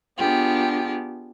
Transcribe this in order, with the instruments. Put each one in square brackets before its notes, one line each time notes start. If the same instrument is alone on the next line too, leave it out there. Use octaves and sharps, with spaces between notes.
[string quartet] B3 D4 F4 G4 G#4